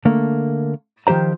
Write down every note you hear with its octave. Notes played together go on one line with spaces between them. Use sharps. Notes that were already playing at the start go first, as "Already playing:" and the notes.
D3 A3 A#3
D#3 F3 G4 C5 A#5